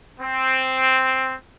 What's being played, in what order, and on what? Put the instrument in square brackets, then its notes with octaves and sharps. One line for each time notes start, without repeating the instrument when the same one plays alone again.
[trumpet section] C4